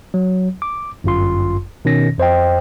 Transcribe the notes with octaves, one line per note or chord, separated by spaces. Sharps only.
F#3
D6
G1 F#2 F4 C6
B2 D#3 C#4 A#6
F2 C5 D#5 G5